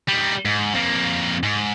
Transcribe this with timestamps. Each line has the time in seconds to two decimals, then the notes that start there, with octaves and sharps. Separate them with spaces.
0.09 G3 D#4
0.45 G#2
0.75 F2 A#3
1.43 G#2